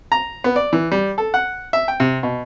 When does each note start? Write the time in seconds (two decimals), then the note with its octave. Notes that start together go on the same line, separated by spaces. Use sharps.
0.12 A#5
0.44 B3
0.56 D5
0.73 E3
0.92 G3
1.18 A4
1.34 F#5
1.73 E5
1.88 G5
2.00 C3
2.23 B2